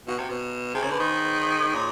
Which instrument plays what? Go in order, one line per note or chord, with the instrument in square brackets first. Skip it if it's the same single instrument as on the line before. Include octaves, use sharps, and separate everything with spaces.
[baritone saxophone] B2 [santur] F#4
[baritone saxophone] C3
B2
[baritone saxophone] C3 [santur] G#4
[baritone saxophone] C#3 [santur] A#4
[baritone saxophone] D3 [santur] B4
[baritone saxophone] D#3 [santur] C5
[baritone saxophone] A#2 [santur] C#5